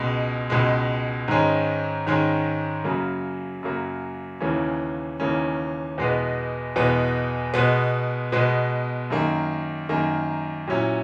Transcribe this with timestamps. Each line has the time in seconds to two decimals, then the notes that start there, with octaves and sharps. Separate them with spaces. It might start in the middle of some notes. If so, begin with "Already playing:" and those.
Already playing: C#2 B2 G#3
0.50 C#2 B2 G#3
1.28 G#2 D#3 G#3 C#4
2.07 G#2 D#3 G#3 C#4
2.84 F#2 C#3 F#3 A#3
3.63 F#2 C#3 F#3 A#3
4.40 D#2 C#3 E3 A#3 C#4
5.20 D#2 C#3 E3 A#3 C#4
5.98 E2 B2 G#3 B3
6.76 E2 B2 G#3 B3
7.54 B2 G#3 B3
8.32 B2 G#3 B3
9.10 F#2 D#3 A#3
9.89 F#2 D#3 A#3
10.67 A#2 F#3 C#4 E4